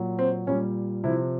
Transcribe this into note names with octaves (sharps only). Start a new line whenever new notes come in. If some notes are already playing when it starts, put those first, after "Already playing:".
Already playing: A#2 F#3
C4
A#2 G3 C#4
C3 F3 E4